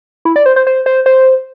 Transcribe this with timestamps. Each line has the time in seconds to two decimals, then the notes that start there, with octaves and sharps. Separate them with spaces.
0.25 E4
0.36 D5
0.46 C5
0.56 C5
0.67 C5
0.86 C5
1.06 C5